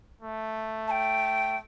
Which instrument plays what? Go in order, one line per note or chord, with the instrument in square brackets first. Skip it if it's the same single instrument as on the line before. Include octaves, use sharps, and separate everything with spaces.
[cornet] A3
[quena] A5
G5